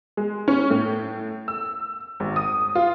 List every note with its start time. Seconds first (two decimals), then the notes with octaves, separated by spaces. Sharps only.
0.17 G#3
0.48 C#4
0.70 A2
1.48 E6
2.20 G#1
2.36 D#6
2.75 F4